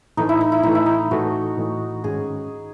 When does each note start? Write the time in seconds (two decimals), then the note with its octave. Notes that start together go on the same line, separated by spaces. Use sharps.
0.17 A2 E3 A3 D#4
0.29 E4
0.41 D#4
0.52 E4
0.63 A2 E3 A3 D#4
0.75 E4
0.86 D#4
1.11 A2 E3 A3 F#4
1.57 A2 E3 A3
2.04 G#2 D#3 G#3 C#4 G#4